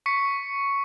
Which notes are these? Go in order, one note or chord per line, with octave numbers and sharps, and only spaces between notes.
C#6 B6 C#7